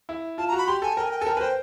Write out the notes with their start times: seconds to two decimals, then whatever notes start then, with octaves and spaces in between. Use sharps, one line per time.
0.09 E4
0.38 F4 A5
0.48 A#5
0.52 F#4
0.58 B5
0.67 G4 C6
0.82 A4 G#5
0.97 A#4 G5
1.04 G#5
1.11 G5
1.19 G#5
1.22 A4
1.26 A#4 G5
1.34 G#5
1.37 B4
1.41 C5 G5